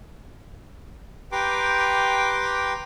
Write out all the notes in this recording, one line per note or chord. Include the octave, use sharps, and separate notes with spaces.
G4 B4 G5 A#5 C6 D6